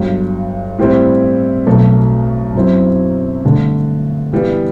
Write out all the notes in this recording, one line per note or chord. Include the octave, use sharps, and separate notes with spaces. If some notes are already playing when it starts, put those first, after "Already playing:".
Already playing: G1 G2 F#3
A2 G3 C4 E4
B1 B2 F#3 A3
F#2 F#3 C4 E4
G2 D3 A3
G2 E3 G3 B3